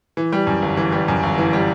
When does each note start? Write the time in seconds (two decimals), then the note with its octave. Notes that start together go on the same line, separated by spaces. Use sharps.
0.17 E3
0.32 G3
0.47 F#2
0.62 G1
0.77 E3
0.92 G3
1.08 F#2
1.23 G1
1.38 E3
1.53 G3